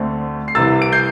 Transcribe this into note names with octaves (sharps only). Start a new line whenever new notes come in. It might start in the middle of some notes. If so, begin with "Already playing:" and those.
Already playing: D2 D3 A3 C4
C7
C2 C3 E3 E6 A6
D7
G6 C7